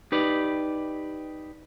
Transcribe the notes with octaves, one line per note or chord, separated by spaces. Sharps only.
D#4 G4 B4 D5